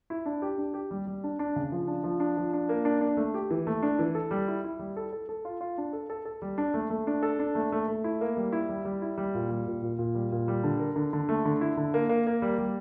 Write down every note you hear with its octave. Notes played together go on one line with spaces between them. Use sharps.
E4
D4
G4
D4
G4
G3
G3
D4
D4
C#3
F3
D4
F3
D4
F3
D4
A#3
D4
D4
A3
G4
E3
A3
D4
E3
A4
G3
E4
E4
G3
A4
A4
A4
F4
F4
D4
A4
A4
A4
G3
D4
A3
A3
D4
A4
D4
A3
A3
A3
E4
A#3
G3
E4
G3
G3
E4
G3
A#2
G3
A#2
A#2
A#2
G3
A#2
G3
D3
A#4
D3
D3
A3
D3
E4
D3
A#3
A#3
A#3
G3
G3